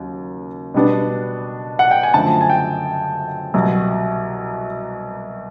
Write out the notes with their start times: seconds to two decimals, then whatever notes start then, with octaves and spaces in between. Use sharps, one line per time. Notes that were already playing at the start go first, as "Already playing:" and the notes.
Already playing: D#2 C#3 F#3
0.74 B2 G3 B3 D4
1.79 F#5
1.91 G5
2.03 G#5
2.14 F#2 D3 F3 A3 A5
2.41 G#5
2.50 G5
3.54 C2 B2 F#3